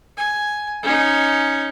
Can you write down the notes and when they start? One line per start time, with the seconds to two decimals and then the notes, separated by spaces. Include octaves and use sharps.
0.17 G#5
0.83 C#4 D#4